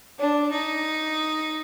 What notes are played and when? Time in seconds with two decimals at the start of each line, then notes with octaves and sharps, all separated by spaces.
0.19 D4
0.51 D#4